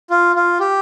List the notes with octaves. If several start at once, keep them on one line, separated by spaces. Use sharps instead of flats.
F4
F4
G4